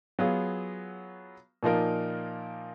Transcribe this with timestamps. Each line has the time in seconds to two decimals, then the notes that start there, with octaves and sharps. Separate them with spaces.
0.19 F#3 B3 F4 G#4
1.63 A#2 F3 A#3 D#4 A#4